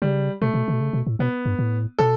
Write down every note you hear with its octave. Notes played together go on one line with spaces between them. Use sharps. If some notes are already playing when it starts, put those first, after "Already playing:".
C#3 G3
B2 A3
B2
C#3
B2
C#3
B2
A2
B2 B3
G2
A2
B2 A4